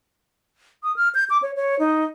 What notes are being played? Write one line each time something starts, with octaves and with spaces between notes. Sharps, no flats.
D#6
F6
G6
D6
C#5
C#5
D#4